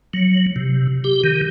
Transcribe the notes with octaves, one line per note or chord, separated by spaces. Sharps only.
F#3
C3
G4
D#3